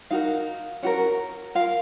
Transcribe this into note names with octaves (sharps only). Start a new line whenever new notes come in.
D#4 F#4 A#4 F5
C#4 F#4 A#4 F#5
F4 A#4 F5